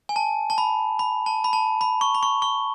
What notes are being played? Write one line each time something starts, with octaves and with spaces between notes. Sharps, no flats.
G#5
A5
A5
B5
B5
A5
B5
A5
B5
C#6
B5
C#6
C#6